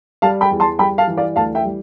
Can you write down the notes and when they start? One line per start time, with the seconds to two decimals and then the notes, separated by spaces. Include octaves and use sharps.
0.22 G3 F5 A5
0.41 G5 B5
0.51 E2
0.60 A5 C6
0.79 G3 G5 B5
0.98 F5 A5
1.08 E3
1.17 D5 F5
1.36 D2 F5 A5
1.55 E5 G5
1.64 G3